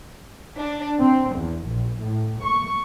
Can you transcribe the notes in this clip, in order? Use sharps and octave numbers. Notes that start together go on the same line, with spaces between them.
D4
C4
E2
A#1
A2
C#6